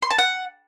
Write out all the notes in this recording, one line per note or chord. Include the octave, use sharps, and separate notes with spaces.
C6
A5
F#5